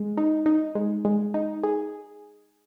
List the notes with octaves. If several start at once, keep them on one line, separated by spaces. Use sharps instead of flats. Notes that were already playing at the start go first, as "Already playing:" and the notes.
Already playing: G#3
D#4
D#4
G#3
G#3
D#4
G#4